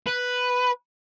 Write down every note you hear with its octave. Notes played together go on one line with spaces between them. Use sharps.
B4